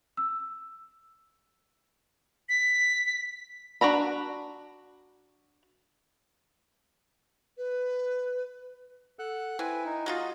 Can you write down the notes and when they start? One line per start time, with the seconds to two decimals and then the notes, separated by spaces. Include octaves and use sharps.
0.17 E6
2.49 B6
3.81 D4 F#4 A#5 B5
7.57 B4
9.19 A4 F#5 F#6
9.59 C4 E4 B4 G#5
9.85 D#4
10.06 G#3 D#4 F4 F#4 D#5